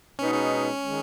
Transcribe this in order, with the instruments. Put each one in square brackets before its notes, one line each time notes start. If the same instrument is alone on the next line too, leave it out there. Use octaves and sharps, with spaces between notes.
[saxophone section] B2 G#3 B3 D#4 [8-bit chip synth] C#4
[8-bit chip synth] C#4
[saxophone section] D#3 G#3